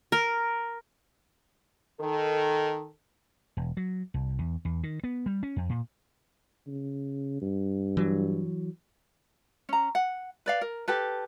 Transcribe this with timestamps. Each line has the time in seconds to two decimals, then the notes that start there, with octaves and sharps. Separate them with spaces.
0.12 A#4
2.01 D#3 A4
3.57 E1
3.77 F#3
4.14 C2
4.39 E2
4.65 E2
4.83 D#3
5.04 B3
5.26 G3
5.43 C#4
5.56 F2
5.70 A#2
6.67 C#3
7.42 G2
7.97 E3 F#3
9.69 C#4 A#5
9.95 F#5
10.46 B4 D5 F5
10.61 A#4
10.88 G4 A4 B4